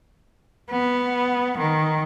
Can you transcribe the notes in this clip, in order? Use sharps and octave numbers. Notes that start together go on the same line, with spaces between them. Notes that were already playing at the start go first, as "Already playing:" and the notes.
B3
D#3